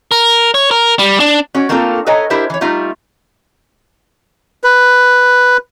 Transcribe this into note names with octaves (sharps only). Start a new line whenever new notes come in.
A#4
C#5
A#4
G3
D4
C#4 F#4 D5
A3 A#3 C4 D4 F4 A4
A4 B4 C#5 D#5 G#5 A#5
D4 E4 G4 A#4 C5 E5
E3 C#5
G3 A3 D#4 F4 E5
B4